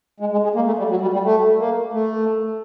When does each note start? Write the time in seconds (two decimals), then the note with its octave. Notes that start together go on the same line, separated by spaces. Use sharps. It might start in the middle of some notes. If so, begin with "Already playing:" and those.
0.20 G#3
0.32 G#3
0.44 G#3
0.55 A#3
0.66 A3
0.78 G3
0.90 F#3
1.02 G3
1.13 G3
1.25 A3
1.59 A#3
1.93 A3